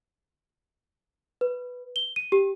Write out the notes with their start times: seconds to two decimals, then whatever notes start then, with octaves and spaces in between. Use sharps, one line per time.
1.41 B4
1.96 G7
2.16 D#7
2.32 G4